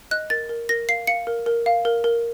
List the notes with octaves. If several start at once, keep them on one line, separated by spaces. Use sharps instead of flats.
D#5 F#6
A#4 A6
A#4
A#4 A#6
F5 C7
F5 C#7
A#4
A#4
F5
A#4
A#4